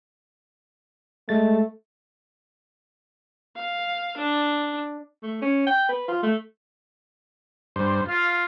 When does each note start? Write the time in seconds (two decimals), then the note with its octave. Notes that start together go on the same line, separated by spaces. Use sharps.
1.29 G#3 A3 A6
3.56 F5
4.17 D4
5.23 A3
5.42 C#4
5.67 G5
5.89 B4
6.08 F4
6.23 A3
7.76 G2 C5
8.09 F4 F5